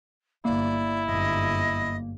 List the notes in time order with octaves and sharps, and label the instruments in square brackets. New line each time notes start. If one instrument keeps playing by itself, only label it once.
[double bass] G1 [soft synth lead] A#3 [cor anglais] E4 [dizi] D5
[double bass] G1 F#2 [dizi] D#5